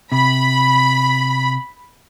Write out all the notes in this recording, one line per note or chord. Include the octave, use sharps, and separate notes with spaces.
C3 B5